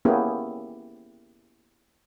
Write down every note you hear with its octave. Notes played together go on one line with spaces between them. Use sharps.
A#3 B3 C#4 E4 G4 G#4